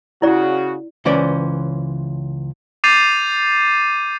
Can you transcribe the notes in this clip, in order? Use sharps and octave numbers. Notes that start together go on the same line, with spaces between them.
C#3 E4 F#4 D5
C#2 E3 C#4 C5 D5
D6 G6 A6 C7 D#7 F7